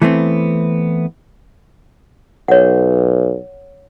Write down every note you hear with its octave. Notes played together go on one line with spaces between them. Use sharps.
E3 A3 B3 C4
B1 C#5 F#5